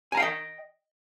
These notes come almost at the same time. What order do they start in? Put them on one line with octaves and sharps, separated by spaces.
G#5 A#5 F5 G5 D#5